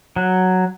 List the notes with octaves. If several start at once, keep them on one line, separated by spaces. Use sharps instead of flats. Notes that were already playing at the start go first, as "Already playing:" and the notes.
F#3